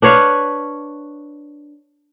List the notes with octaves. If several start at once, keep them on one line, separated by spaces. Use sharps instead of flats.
D4 B4 C#5 F5